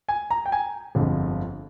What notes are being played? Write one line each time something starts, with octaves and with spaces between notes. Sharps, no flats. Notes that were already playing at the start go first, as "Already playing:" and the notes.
G#5
A#5
G5
G#5
G1 F2 D3 F3 G#3